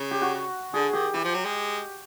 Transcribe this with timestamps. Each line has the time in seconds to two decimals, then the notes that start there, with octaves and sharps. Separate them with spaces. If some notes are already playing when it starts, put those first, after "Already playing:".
Already playing: C#3
0.11 G4
0.22 F#4
0.73 D3 G#4
0.93 D#3 G4
1.13 E3 G4
1.24 F3
1.35 F#3
1.45 G#3